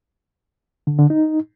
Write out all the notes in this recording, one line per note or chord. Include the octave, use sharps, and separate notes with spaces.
D3
D3
D#4